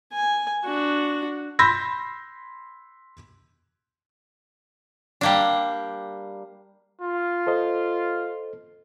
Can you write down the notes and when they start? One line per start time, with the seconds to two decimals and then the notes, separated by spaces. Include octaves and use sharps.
0.13 G#5
0.65 D4 F#4
1.59 B5 C6 E6 G6 A#6 B6
5.21 G3 A#3 D4
7.00 F4
7.47 A4 C5 D#5